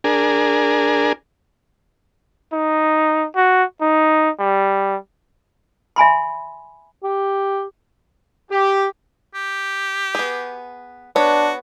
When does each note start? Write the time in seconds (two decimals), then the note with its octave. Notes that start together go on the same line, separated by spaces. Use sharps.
0.04 D4 G#4 A#4
2.53 D#4
3.36 F#4
3.81 D#4
4.39 G3
5.96 E5 G#5 B5 C6
7.03 G4
8.51 G4
9.34 G4
10.15 B3 G#4
11.16 B3 D4 F#4 C#5